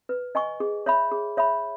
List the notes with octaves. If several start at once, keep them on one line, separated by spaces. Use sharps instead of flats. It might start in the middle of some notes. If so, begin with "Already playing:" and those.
B4
D#5 G#5 C#6
G#4
C#5 E5 B5
G#4
C#5 E5 B5